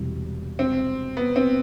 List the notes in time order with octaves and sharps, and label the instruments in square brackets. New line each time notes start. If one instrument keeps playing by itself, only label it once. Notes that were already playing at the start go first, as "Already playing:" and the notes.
Already playing: [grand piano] E1 E2 C3 E3 G3
[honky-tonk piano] C4
B3
C4